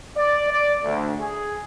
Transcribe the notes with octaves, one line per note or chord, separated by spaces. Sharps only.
D5
D5
D2
G#4